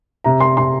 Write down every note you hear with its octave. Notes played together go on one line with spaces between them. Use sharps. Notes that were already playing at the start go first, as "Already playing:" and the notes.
C3 A#5
C6
C3 C6